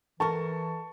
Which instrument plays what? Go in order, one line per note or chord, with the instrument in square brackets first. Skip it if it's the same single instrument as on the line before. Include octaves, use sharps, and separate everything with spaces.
[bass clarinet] E3 [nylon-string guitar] A4 A#4 [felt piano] A5 C#6